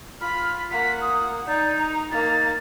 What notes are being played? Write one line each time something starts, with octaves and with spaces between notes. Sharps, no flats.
F4 B5 F6
A#3 F#5 B6
D#6
D#4 D5 G6
A#5
A#3 D#4 A6